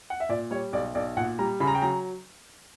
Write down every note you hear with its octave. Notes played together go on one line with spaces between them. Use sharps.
F#5
E5
A#2 D5
G3 C#5
B1 D5
B1 D5
A#2 F#5
G3 A#5
C#3 B5
A#5
G5
F#3 A#5